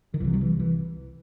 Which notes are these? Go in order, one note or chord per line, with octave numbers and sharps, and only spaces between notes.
D#3
C2 C3 E3
F#3
E3
E3